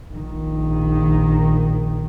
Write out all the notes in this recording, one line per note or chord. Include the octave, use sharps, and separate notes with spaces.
A#1 D#3